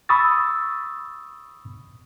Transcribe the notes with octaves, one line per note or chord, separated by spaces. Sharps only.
B5 C#6 D#6 E6 A6